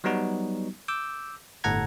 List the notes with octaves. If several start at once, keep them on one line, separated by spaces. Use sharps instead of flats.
F#3 G3 B3 D#4 F#4
D6 E6 G6
G1 A2 A4 F#5 A#5 G#6